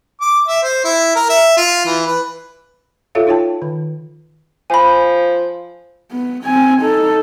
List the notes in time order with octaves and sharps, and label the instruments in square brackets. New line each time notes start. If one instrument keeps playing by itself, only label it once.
[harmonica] D6
E5
C5
E4
A#4
E5
F4
E3
B4
[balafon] F4 F#4 A4 C#5 E5 F5
D#4 F4 C#5 G5 A5
D#3
[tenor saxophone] F3 [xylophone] G#5 B5
[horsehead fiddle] B3
C4 G#5
D#4 A4